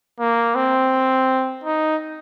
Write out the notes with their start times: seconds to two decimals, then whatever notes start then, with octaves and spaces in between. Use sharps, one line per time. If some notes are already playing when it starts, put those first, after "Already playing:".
0.20 A#3
0.55 C4
1.64 D#4